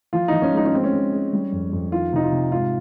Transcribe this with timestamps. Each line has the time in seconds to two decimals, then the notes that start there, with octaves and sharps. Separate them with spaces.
0.13 F3 F4
0.28 F3 D#4
0.42 C#4
0.52 G#3
0.57 D#4
0.66 C#4
0.72 G#3 C4
0.84 C#4
0.93 G#3
1.12 G#3
1.33 G3
1.52 F2
1.73 F2
1.92 D#3 F4
2.13 C3 D#4
2.23 F4
2.32 C3
2.52 G#2 F4